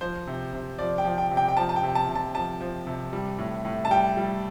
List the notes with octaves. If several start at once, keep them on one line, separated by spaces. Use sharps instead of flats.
F3 C5
C3
C3
F3 D5
G5
F3
G5
C3
G5
G5
F3 A5
A5
G5
C3
A5
C3
A5
F3 A5
F3
C3
G3
A2
A2
A5
G3 G5
G3